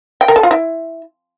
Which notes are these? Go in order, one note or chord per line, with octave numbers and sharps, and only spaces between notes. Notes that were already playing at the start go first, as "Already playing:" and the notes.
G5
A#4
A4
F4
E4